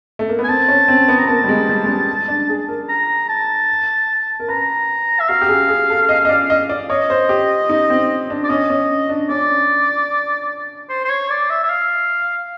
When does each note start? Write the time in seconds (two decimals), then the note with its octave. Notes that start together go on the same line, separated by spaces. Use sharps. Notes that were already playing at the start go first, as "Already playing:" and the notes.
0.19 A3
0.29 A#3
0.39 B3
0.44 G#5
0.49 C4 A5
0.68 C#4
0.88 C4
1.08 B3
1.19 B3 A#5
1.28 A#3 A5
1.44 G3
1.49 G#3
1.69 G3
1.84 G#3
1.88 G3
2.28 D4
2.49 G#4
2.68 A#4
2.89 A#5
3.29 A5
4.40 A#4
4.48 B4 A#5
5.20 E5
5.29 F#4 F5
5.41 G4
5.49 G#4
5.69 G#4
5.90 A4
6.09 D#5
6.25 D#5
6.29 D5
6.50 D#5
6.69 D5
6.90 C#5 D#5
7.10 C5
7.29 G4
7.69 D#4
7.90 C4
8.30 D4
8.44 D5
8.49 C#4 D#5
8.70 C#4
9.09 D4
9.29 C#4 D5
10.90 C5
11.05 C5
11.09 C#5
11.30 D5
11.50 E5
11.64 E5
11.70 F5